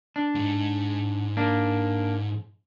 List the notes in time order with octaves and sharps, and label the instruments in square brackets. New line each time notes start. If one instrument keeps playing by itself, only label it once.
[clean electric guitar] D4
[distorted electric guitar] G#2
[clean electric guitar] A#3 D4